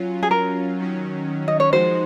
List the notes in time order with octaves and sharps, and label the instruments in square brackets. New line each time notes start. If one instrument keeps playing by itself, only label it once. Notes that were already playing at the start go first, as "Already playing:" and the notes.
Already playing: [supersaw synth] F#3 C#4 F4
[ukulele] G#4
A#4
[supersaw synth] D#3 F#3 C#4
[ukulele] D#5
C#5
[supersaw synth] F3 G#3 D#4 F#4 [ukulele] C5